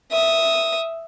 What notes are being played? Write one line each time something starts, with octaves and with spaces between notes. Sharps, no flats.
E5 D#6